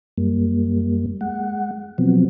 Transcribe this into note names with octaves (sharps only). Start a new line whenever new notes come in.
F#2 G3 A#3
G#3 F#5
B2 F3 F#3 B3 C4